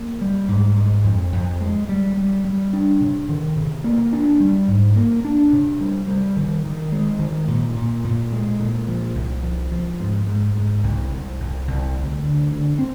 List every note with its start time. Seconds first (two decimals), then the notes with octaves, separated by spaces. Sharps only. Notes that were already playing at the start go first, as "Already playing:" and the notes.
Already playing: A#3
0.21 G3
0.48 G#2
0.77 G#3
1.04 F2
1.32 F2
1.60 G#3
1.89 G3
2.17 G3
2.45 G3
2.73 D4
3.01 C3
3.29 D#3
3.56 C3
3.84 A#3
4.13 D4
4.40 G3
4.68 G#2
4.96 A#3
5.25 D4
5.53 C3
5.81 G3
6.07 G3
6.36 D#3
6.64 D#3
6.92 G#3
7.19 D#3
7.48 A#2
7.76 A#2
8.04 A#2
8.32 G#3
8.60 A#2
8.88 F3
9.15 C2
9.43 F3
9.72 F3
10.00 G#2
10.27 G#2
10.55 G#2
10.83 C2
11.12 C2
11.40 C2
11.67 C2
11.95 D2
12.23 D3
12.52 D3
12.79 C4